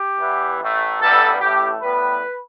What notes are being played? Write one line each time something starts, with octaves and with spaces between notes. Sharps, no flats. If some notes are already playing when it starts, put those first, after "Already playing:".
Already playing: G4
E2 E3 B3
A1 A2 A3
A1 G2 G3 B3 A4
A1 A2 A3 G4
A2 G3 B3 B4